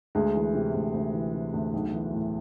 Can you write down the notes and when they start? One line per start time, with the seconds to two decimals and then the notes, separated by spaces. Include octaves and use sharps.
0.15 D2 G#3
0.35 E3
0.55 C3
0.74 D2
0.94 D2
1.14 E3
1.34 C3
1.53 D2
1.73 B1
1.94 E3
2.13 A2